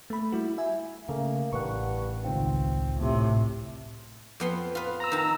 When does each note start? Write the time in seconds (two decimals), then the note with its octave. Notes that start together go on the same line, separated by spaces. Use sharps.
0.10 A3 B5
0.32 G3 A3 E4 F#4
0.58 E5 G#5
1.09 C#3 A3 A#3
1.53 A1 G2 F#5 C#6
2.24 C#2 D#3 C4 F4
2.97 A2 C3
4.40 F2 B3 C6
4.75 F4 B4
5.00 A#5 E6
5.12 D#3 A5